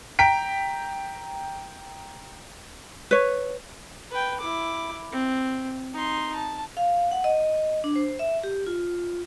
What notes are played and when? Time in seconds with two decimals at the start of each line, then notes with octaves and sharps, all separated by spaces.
0.19 G5 A#5 B6 D7
3.11 B4 C#5
4.11 B4 G5
4.40 E4 D6
5.12 C4
5.94 D#4 C6
6.35 A5
6.77 F5
7.11 F#5
7.24 D#5
7.84 D4
7.96 C5
8.19 E5
8.43 G4
8.66 F4